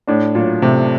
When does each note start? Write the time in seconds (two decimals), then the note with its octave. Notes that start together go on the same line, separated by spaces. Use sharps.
0.07 A2 D4
0.35 A#2 F#3
0.62 C3 A3